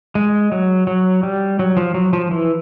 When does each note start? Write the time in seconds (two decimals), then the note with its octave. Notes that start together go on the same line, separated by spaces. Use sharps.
0.15 G#3
0.52 F#3
0.87 F#3
1.23 G3
1.59 F#3
1.77 F3
1.94 F#3
2.13 F3
2.31 E3